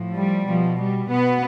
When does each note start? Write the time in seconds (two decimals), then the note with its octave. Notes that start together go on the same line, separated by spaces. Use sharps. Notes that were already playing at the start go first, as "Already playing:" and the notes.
Already playing: A2 F3
0.14 G3
0.45 B2 F3
0.78 G3
1.09 B2 B3